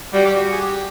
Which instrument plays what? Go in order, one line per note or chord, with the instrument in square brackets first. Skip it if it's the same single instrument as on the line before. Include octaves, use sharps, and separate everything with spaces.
[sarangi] G3 [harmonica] F#4
[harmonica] G4
F#4
G#4
G4